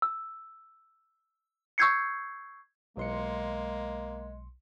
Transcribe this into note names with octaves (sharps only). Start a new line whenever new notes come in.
E6
C#6 E6 G6 G#6 C7 C#7
B1 G#3 A#3 C6 C#7